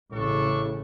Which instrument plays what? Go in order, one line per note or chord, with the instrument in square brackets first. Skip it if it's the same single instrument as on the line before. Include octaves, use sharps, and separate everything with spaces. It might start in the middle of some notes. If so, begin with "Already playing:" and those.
[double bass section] A1 C#3 [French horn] A2 [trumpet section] D4 A4 C#6